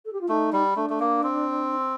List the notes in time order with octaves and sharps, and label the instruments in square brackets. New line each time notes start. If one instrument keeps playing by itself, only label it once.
[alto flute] A4
G4
F4
[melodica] A3 [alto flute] D#4
[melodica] G3
[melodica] A3 [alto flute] D4
[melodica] A3
A#3
C4